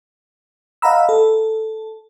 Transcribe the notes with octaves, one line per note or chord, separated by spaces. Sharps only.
D#5 F5 F#5 A#5 B5 E6
A4